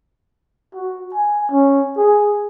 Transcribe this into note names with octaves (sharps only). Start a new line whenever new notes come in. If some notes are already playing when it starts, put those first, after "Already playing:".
F#4
G#5
C#4
G#4